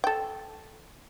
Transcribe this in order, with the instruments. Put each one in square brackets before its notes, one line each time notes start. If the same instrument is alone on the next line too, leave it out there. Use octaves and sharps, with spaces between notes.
[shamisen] A4 G5